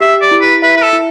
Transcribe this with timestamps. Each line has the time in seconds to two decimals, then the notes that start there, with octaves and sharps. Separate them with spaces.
0.01 G4 E5
0.22 D5
0.31 E4
0.41 B4
0.62 B4 E5
0.77 B4
0.82 A4
0.93 E4